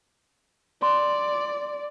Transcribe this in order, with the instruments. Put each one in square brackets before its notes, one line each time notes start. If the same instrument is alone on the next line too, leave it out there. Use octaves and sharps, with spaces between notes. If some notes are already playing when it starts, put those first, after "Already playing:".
[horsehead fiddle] D5 [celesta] C6